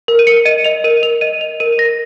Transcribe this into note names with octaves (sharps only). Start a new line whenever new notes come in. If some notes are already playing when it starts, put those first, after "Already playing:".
A#4
D#7
A#4 C#7
D#5 D#7
D#5 F7
A#4 D#7
A#4 F7
D#5 D#7
D#5 F7
A#4 D#7
A#4 A#6